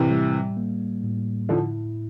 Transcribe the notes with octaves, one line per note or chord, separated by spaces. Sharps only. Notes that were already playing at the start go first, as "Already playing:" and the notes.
Already playing: A2 C3 E3
G3
A#3
A2
D3 F3 E4